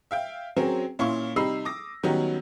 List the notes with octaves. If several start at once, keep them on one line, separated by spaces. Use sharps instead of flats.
E5 F5 G5
F#3 C4 C#4 G#4 A#4
A#2 C#4 E4 F5 C6 C#6
C3 G3 D#4 B5 E6 C7
D6 D#6 A#6
D#3 F#3 G3 B3 C#4 D#4